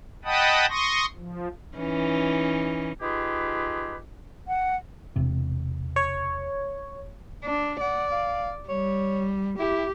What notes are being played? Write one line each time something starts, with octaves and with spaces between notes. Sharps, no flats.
D#5 F#5 G5 A5 B5 D#6
C6 C#6 D#6 A#6
F3
E3 C#4 D#4
D#4 F4 G4 G#4 B4
F#5
E1 C3
C#5
D4
D5 F#5
F5
G3 C#5
E4 G4